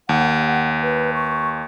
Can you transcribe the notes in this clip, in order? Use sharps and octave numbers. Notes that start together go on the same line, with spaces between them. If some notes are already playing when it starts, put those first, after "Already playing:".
D#2 F#5
B4
C#6